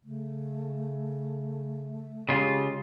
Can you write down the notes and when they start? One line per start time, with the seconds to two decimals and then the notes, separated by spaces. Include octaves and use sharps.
0.05 C#3 A3
2.29 C#3 G#3 F4 G4